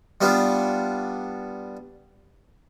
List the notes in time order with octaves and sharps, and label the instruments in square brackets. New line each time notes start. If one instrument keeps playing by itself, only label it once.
[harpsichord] G3 B3 D4 F4